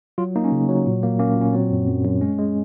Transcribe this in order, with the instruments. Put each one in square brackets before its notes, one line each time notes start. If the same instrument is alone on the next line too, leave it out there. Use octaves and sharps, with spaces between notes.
[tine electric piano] F#3 F4
A#3 D#4
C#4
C#3
F#3
A#2
A#3
A#3 C#4
A#2
C#4
F#3 C4
F#2
F#2
F#2
G#3 C#4
G#3